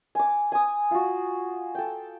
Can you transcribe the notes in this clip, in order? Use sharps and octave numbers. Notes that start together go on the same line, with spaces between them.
G#5 D6
G#5 D#6
F4 F#4
A4 G5